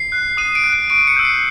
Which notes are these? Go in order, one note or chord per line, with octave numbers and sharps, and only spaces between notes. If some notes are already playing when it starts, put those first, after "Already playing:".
Already playing: C7
F#6
D#6 D#7
D7
F#6
D7
C#6 D7
C#7
E6 G6
C7